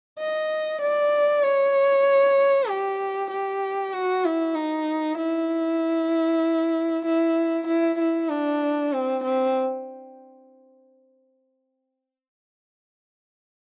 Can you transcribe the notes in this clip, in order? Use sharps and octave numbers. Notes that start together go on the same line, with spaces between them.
D#5
D5
C#5
G4
G4
F#4
E4
D#4
E4
E4
E4
E4
D4
C4
C4